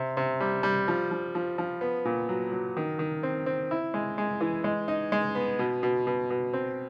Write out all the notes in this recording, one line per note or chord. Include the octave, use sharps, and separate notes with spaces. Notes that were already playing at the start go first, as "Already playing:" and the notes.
Already playing: C3
C3
G3
G3
F3
F3
F3
F3
B3
A#2
F#3
F#3
D#3
D#3
C4
C4
E4
G#3
G#3
E3
G#3
D#4
G#3
B3
B2
B2
B2
B2
C4